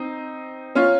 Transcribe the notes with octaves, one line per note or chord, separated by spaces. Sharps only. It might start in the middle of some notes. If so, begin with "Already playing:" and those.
Already playing: C4 D#4
C#4 F4